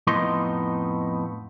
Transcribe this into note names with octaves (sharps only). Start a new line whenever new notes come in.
F2 A2 B3 D#4 D#5 C6